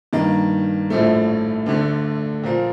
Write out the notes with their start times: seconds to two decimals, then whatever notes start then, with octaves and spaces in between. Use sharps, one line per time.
0.13 G2 D#3 A#3 D#4
0.90 A#1 A2 F3 A3
1.66 D2 D3 A3
2.43 A#2 F3 A#3 F4